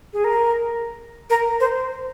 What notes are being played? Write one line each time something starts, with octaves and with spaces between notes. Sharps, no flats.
G#4
A#4
A#4
C5